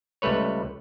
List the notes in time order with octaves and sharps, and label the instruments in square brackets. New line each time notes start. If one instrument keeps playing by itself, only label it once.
[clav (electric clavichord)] C#2 G3 A3 B4 C#5